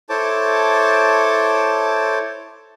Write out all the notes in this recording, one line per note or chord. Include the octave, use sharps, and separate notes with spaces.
E4 A4 C5 C#5 A5 D6